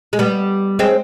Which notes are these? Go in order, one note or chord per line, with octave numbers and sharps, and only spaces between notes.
G#3
G3 B3
G#3 C4